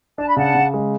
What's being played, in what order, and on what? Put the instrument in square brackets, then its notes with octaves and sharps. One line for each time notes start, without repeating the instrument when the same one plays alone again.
[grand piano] D4 [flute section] A5
[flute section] B5
[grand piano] C#3 [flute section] F#5 A5
[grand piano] C#3
G#3